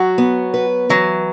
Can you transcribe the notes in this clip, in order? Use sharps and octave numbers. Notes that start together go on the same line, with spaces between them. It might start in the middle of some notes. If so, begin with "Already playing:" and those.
Already playing: F#3 F#4
B3
B4
E3 F#3